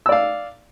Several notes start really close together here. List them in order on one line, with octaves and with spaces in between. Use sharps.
E6 D5 F5